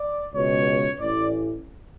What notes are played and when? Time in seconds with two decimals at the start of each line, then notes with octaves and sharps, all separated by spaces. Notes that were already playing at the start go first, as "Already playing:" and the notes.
Already playing: D5
0.34 C#2 B2 C#5
0.99 A1 A2 E3 D5